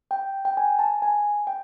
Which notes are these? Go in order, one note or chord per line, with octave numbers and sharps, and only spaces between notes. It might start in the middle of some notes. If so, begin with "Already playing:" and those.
G5
G5
G#5
A5
G#5
G5